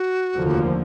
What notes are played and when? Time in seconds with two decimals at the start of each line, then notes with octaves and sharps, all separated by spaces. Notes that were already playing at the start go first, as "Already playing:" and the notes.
Already playing: F#4
0.36 F1 D#2 D3 F3 A#3